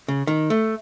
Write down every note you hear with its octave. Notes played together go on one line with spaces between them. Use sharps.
C#3
D#3
A3